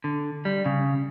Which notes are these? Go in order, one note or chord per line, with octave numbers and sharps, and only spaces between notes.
D3
G3
C#3